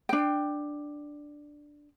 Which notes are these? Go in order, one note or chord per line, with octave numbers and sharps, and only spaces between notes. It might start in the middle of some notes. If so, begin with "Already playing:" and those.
D4 G5